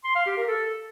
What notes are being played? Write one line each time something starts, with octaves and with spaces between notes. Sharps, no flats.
C6
F5
G4
A#4
A4